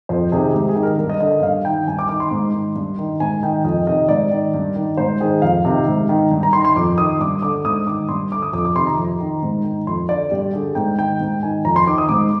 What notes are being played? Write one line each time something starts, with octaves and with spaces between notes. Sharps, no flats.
F2 C5
C3 D#3 G#4
G#2 G4
G#4
D#3
A#4
G2 A#4
D#5
D3 D#5
D#5
G2 F5
D#3 G5
G2 G#5
D6
D#3 D6
C6
G#2
D#3
G2
D#3
G#2 G#5
D#3 G5
F2 D#5
C3 D#3 D#5
G#2 D5
D#3
G2
D#3
G#2 C5
D#3 G#4
F2 F5
C3 D#3
G#2
D#3
G2
A#5
D#3 C6
C6
F2 D6
D#3 D#6
G2 D6
D3 D6
G#2 D#6
D#3 D6
G2 C6
D3 D6
D#6
F2 D6
D6
C3 D#3 C6
A#5
F2
D#3
G#2
D#3
F2 C6
D3 D5
G2 G4
D3 G#4
G#2 G5
D#3 G5
G#2
D#3 G#5
F2 A#5
C6
D#3 D6
D#6
G#2 D6